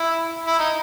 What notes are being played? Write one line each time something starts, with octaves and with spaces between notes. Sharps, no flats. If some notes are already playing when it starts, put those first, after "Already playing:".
Already playing: E4
E4
D#4